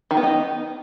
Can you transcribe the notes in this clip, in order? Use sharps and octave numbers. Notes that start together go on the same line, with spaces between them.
D#3
B3
D#4